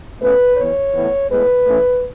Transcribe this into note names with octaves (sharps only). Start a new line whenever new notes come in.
B2 A3 C#4 B4
E3 B3 C#5
A2 E3 B3
A2 G#3 B3 B4
E3 A3 C#4